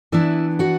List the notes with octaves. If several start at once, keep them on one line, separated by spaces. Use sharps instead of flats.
E3 B3 D4 E4 E5
F#4 F#5